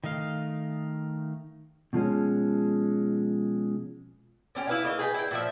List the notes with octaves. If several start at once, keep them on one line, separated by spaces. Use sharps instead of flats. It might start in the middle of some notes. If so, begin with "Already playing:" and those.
D#3 A3 D#5 F5
B2 F3 G#3 C#4
D3 C#4 G4
E4 B4 F5
C#3 A#3 D#5 F5
G#4 B4 G5
E4 G5
A#2 F3 E5